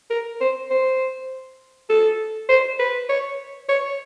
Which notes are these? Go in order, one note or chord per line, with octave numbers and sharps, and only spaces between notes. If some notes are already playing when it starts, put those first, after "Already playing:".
A#4
C5
C5
A4
C5
B4
C#5
C#5